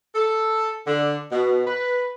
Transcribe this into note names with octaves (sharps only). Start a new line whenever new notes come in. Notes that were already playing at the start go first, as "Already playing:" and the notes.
A4
D3
B2
B4